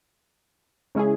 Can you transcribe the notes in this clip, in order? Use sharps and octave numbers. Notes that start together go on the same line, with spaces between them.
C#3 G#3 C#4 E4 G#4